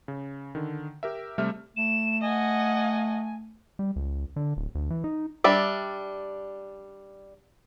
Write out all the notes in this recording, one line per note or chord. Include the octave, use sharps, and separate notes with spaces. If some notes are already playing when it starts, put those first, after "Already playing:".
C#3
D3 D#3
G4 A#4 E5
C3 G3 A3 E5 F6
A3 E7
D#5 F#5 G#5
G3
C#2
D3
D1
D2
E3
D#4
G3 D4 E5